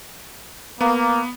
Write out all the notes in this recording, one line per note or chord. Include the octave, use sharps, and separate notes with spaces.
A#3 B3